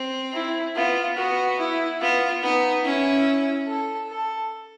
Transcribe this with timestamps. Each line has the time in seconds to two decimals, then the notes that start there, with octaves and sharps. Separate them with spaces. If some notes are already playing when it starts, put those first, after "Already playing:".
Already playing: C4
0.34 E4
0.75 B3 F4
1.16 B3 F#4
1.58 E4
2.01 B3 F4
2.42 B3 D#4
2.84 C#4 E4
3.68 A4
4.10 A4